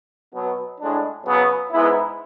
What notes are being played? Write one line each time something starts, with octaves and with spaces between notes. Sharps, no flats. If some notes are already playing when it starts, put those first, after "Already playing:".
B2 F#3 B3
A2 G#3 D4
C#3 F#3 B3
G#2 G#3 B3 E4